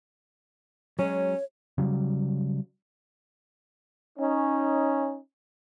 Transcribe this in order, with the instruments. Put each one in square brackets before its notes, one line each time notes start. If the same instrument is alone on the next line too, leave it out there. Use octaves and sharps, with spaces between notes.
[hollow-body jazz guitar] F#3 G#3 [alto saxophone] C#4 [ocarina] C#5
[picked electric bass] C#3 F#3 G3
[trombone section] C#4 D#4